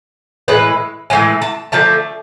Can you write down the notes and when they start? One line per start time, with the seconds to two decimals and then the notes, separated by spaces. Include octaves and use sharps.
0.48 A2 E3 G#3 B4
1.10 A2 E3 G#3 G#5
1.42 A5
1.72 D3 F3 A3 A5